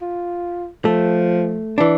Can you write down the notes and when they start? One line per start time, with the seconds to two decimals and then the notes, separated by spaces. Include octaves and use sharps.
0.01 F4
0.85 F3 A3
1.78 E3 D4